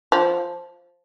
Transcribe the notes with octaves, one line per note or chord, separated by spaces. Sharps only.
F3